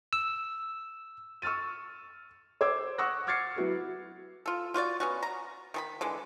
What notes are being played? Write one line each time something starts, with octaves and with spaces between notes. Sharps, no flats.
E6
C#6 E6 F6 A6 D#7
C5 D6 E6 G#6
F#5 C#6 D#6 E6 F#6 A#6
D6 F6 G#6 A6 C7 C#7
F#3 E4 F#4 B4
F4 A4
F4 F#4 C#5 D5
B3 C#4 F#4
A#5
D#3 G#4 B5
D3 E3 G#3